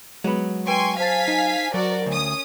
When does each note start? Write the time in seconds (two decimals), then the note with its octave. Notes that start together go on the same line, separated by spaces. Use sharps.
0.24 F#3 G#3 B3
0.67 B4 G5 G#5 C6 C#6 D7
0.99 C5 F5 G#5 A5 A6 B6
1.28 D#4
1.74 F#3 F#4 A#4 D5
2.06 D2 C#4 D#6